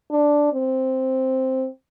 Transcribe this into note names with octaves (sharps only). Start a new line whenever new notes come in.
D4
C4